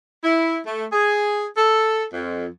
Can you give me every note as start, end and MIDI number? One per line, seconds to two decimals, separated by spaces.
0.23 0.58 64
0.65 0.84 57
0.91 1.44 68
1.56 2.04 69
2.13 2.46 41